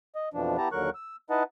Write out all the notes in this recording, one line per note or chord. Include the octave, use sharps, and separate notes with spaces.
D#5
F2 B2 E3 F3 D4
B3 E4 G4 A5 A#5
D#2 D3 F#3 A#4 C#6 F#6
E6
D#4 E4 B4 D#5 F#5 A5